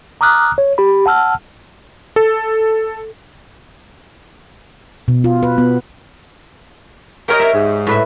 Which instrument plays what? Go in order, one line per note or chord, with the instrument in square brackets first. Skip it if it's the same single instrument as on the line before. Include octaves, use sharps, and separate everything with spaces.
[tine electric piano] A#5 D6 D#6 F6 F#6
C#5
G4 B5
F#5 A5 E6 F6
[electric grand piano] A4
[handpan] B2
F4
B4
B3
[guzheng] G4 C#5 D#5 [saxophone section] A#4
[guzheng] C#5 E5
[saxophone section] G#2
[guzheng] A2 B4 E5